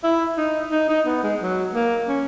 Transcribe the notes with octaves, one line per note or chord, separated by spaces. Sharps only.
E4
D#4
D#4
D#4
B3
G#3
F#3
A#3
C#4